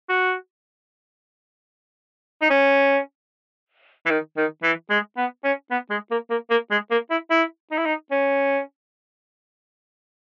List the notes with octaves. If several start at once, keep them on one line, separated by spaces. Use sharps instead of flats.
F#4
D#4
C#4
E3
D#3
D#3
E3
G#3
B3
C#4
B3
G#3
A#3
A#3
A#3
G#3
A#3
E4
E4
D#4
E4
D#4
C#4